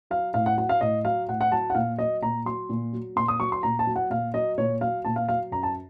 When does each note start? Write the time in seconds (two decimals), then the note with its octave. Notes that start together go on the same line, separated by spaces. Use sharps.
0.10 F#3 F5
0.34 A2 F5
0.46 F#5
0.57 F#3 F#5
0.69 F5
0.81 A2 D#5
1.05 F#3 F5
1.28 A2 F#5
1.41 F#5
1.52 F#3 A5
1.70 F#5
1.75 A#2 F5
1.98 F#3 D#5
2.22 A#2 A#5
2.46 F#3 C6
2.69 A#2
2.93 F#3
3.16 A#2 C6
3.28 D#6
3.40 F#3 C#6
3.52 C6
3.63 A#2 A#5
3.79 A5
3.87 F#3
3.96 F#5
4.10 A#2 F5
4.34 F#3 D#5
4.58 A#2 C#5
4.81 F#3 F5
5.05 A#2 A5
5.16 F5
5.28 F#3 F5
5.51 F#2 A#5
5.63 A5